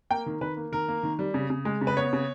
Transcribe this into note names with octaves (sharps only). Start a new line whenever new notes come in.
A#3 G5
D#3
D#3 B4
A#3
D#3 A#4
A#3
D#3
G3
C#3
C#3
G#3
C#3
B4
B3 C#5
C#3